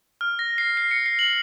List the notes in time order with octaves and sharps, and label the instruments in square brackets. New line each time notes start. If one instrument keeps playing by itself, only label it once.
[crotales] F6
A#6
C7
C7
C#7
C7
F#7